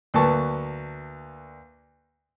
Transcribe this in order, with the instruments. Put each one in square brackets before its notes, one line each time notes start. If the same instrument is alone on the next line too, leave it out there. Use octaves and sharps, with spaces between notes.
[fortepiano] D2 A#3 B4 A5 C#6